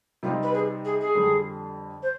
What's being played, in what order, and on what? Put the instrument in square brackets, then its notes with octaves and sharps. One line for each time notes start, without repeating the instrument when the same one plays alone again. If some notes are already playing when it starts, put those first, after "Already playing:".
[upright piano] C3 G3 C4 D#4 [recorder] F4
[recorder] B4
G#4
G#4
G#4
[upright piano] F2 D3 G3
[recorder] C5